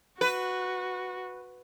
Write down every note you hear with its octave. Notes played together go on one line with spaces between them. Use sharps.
F#4 B4